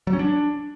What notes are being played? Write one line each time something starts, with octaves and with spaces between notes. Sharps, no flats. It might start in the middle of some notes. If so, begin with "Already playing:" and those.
F#3
C#4
D4